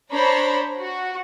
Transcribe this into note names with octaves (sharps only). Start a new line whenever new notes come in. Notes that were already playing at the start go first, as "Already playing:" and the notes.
D4 C5 C#5 A#5 B5
F#4